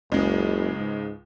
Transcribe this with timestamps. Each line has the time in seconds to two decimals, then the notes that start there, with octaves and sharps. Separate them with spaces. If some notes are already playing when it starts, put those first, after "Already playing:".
0.12 F#1 C#2 C#3 G#3
0.78 G#2